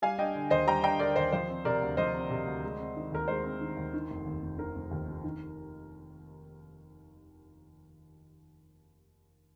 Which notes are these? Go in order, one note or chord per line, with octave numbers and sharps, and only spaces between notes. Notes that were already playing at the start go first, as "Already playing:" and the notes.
G3 F5 G#5
D4 D#5 G5
D3
D#2 C5 D#5
G3 G5 A#5
D4 G5 A#5
D3 A#4 D5
D#2 C5
F3 C5
C4
C3 A#4 D5
D2
F3 C5 D#5
C4
C3
D2
G#3
C4
D#3
D#2 A#4
G#3 C5
C4
D#3
D#2
D#3
F1
D#2
F1
D#3 A#4
F1
D#2
F1
D#3